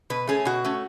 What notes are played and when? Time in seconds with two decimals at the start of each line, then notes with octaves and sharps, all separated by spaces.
0.10 B2 B4
0.27 A3 C#4 G#4
0.45 B2 F#4
0.64 A3 C#4